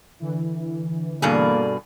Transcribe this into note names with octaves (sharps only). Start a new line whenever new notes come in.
D3 E3
G2 B2 A#3 G#4 A4 D5